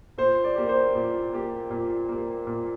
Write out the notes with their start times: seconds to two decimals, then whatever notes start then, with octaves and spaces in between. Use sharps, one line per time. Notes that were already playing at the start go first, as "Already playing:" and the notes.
0.18 A#2 C5
0.44 D5
0.56 A#3 G4
0.69 C5
0.95 A#2
1.33 A#3 G4
1.71 A#2
2.09 A#3 G4
2.47 A#2